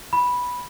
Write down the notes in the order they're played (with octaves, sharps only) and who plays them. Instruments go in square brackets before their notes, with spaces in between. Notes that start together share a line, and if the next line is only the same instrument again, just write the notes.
[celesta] B5